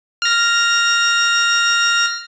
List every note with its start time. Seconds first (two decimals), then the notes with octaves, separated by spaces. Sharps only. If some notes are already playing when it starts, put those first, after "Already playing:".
0.22 F6 A#6